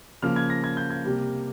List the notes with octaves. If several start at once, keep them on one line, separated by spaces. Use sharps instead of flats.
C#3 F3 A#3 F6
G#6
A#6
G#6
G6
G#6
C3 G3 A#3